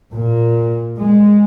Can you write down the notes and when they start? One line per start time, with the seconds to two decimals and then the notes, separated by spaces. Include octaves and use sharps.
0.13 A#2
0.98 G#3